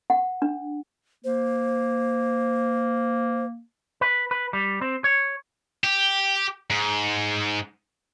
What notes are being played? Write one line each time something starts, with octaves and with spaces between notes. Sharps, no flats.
F#5
D4
A#3 C5
B4
B4
G3
C4
C#5
G4
G#2